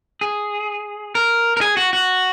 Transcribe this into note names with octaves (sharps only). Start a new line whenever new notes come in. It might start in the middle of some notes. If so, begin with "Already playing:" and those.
G#4
A#4
A#4
G#4
F#4
F#4